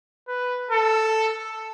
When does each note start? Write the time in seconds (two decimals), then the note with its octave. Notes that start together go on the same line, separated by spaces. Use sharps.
0.28 B4
0.71 A4